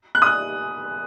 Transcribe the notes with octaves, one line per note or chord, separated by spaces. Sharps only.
F#6
D#6
F#6